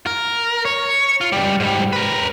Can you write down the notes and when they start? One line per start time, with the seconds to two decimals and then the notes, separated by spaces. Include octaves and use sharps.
0.07 A#4
0.65 C#5
1.21 F4
1.33 C#2 G3
1.60 G#2 G3
1.93 A#4 B4